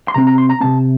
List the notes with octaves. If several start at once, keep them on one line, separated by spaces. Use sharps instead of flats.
C6
C3 F#3 C4 A#5
A#5
C6
A#5
C3 F#3 C4 A5